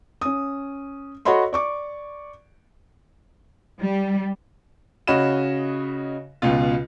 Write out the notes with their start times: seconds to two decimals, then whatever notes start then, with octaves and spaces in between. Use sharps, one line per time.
0.21 C#4 D#6
1.25 F#4 A4 C#5 D#5 B5 C6
1.53 D5 C#6 D6
3.80 G3
5.07 C#3 F#4 C#5 D#5 B5 E7
6.42 C#2 B2 F4